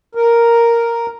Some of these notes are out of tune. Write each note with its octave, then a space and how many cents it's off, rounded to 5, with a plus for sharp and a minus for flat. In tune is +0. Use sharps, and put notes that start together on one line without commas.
A#4 +0